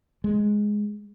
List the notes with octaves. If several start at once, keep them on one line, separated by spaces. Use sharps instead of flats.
G#3